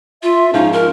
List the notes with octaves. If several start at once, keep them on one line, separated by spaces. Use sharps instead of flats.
F4 E5
G#2 F3 C#4 D#4 F4
A#4